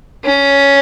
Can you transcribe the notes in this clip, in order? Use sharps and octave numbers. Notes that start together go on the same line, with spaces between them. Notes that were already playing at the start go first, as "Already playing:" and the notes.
C#4